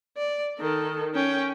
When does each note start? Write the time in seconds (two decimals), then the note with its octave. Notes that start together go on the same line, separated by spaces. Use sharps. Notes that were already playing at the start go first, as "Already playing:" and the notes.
0.17 D5
0.57 D#3 A4
1.15 C#4 G5